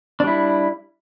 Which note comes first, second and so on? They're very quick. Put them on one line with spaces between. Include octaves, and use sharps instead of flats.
D4 G3 E4